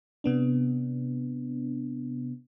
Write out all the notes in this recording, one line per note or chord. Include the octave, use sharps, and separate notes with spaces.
C3 B3 D4